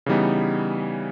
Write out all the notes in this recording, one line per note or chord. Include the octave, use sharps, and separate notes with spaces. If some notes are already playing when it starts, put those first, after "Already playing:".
C#3 E3 G3 B3 D#4